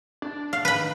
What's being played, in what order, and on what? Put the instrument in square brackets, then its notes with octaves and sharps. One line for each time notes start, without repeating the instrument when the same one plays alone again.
[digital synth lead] D4
[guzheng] F5
[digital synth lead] D#3 [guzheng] B4 B5